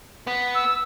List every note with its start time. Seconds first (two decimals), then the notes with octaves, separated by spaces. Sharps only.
0.27 B3
0.55 E6